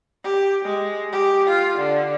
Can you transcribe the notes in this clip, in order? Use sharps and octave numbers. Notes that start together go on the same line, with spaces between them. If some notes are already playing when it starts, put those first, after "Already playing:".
G4
G#3
G4
F4
D3